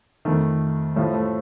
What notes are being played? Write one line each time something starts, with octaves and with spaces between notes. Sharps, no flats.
F2 D#3 A3
A2 F3 G3
A3